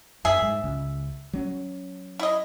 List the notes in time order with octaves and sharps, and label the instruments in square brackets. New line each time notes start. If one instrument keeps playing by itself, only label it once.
[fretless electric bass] F#2 [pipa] G#4 E5
[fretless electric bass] G#2
C#2
F#3 C#4
[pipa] E4 D#5